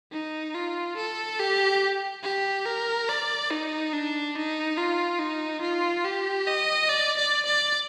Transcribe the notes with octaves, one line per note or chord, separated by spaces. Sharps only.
D#4
F4
A4
G4
G4
A#4
D5
D#4
D4
D#4
F4
D#4
F4
G4
D#5
D5
D5
D5